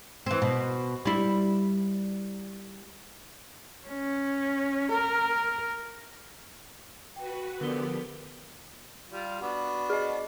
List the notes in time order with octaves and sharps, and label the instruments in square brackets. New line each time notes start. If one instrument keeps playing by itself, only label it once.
[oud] E3 C4
B2
G3 E4
[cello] C#4
A#4
[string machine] F#4 B4 [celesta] G5
[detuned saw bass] D3 [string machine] F3 G4 [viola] B3 [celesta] A#4 G7
[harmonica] G3 F4
B3 D4 F#4
[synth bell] G#4 D#5